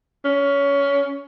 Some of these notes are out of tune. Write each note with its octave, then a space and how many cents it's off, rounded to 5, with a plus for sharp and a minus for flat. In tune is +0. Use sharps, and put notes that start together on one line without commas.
C#4 +20